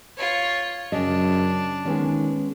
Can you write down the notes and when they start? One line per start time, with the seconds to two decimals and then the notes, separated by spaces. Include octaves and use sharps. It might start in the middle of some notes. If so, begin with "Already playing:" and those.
0.17 F4 C#5
0.92 F#2 C#3 D4 D#5
1.86 D#3 G#3 B3 C#4